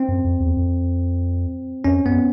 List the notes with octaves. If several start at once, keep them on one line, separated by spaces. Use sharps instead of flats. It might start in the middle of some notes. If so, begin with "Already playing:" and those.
Already playing: C4
F#2
F2
E2
F2
F2 C#4
F#2 B3